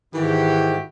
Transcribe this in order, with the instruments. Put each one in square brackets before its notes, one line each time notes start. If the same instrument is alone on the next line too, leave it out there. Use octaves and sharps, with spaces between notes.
[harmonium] G#2 [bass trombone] D#3 [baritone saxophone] E3 [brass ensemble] E4 F#4 G4